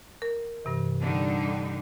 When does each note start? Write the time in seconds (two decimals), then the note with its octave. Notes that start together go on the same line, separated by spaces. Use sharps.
0.22 A#4
0.65 G2 C3 E3
1.01 D3 G3 D#4